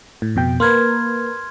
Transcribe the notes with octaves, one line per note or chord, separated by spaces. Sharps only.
A2
F2 B2 G5
A#3 A#4 B4 C6 F6 G#6